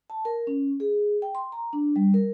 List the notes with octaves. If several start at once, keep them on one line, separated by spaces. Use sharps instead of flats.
A5
A#4
C#4
G#4
G5
C6
A#5
D4
G3
A#4